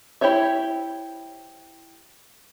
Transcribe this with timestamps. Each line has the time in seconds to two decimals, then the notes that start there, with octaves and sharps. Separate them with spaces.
0.21 E4 G4 C5 C#5 E5